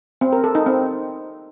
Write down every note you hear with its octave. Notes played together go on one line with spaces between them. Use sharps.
C4
A#4
A4
D#4
C4